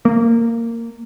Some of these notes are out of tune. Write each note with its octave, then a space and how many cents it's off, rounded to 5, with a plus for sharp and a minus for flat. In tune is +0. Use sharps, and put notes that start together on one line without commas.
A#3 -15